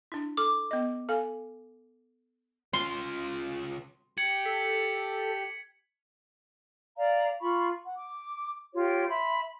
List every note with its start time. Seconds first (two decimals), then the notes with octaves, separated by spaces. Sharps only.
0.12 D4 E4
0.37 A4 D6
0.71 B3 D#5
1.09 A4 F5 G#5
2.73 C#3 F4 C6
4.18 G4 G#6 C#7 F#7
4.45 A4 B6
6.96 D5 F5 A#5
7.41 F4 B5 C#6
7.84 F#5
7.97 D6
8.74 F4 G4 C#5
9.08 E5 B5 C6